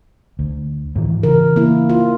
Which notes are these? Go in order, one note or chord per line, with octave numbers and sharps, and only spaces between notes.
D2
G#2 D#3 E3
C#3 E3 A#4
A#3 E4
F4